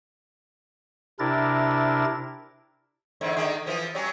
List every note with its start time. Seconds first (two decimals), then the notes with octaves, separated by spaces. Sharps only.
1.19 C3 D4 E4 A#4 A6
3.21 E2 G#2 D3
3.37 D3 D#3 G#3
3.66 E3 F3 B3
3.95 F#3 G3 C#4